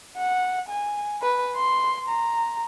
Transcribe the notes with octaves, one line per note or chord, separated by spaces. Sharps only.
F#5
G#5
B4
C6
A#5